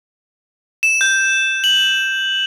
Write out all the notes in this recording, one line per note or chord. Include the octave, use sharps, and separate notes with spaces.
E7
G6
F#7